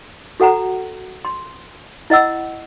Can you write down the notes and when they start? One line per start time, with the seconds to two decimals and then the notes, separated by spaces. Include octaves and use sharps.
0.40 F#4 A4 F#5 G#5 A#5
1.25 C6
2.10 E4 D#5 F#5 E6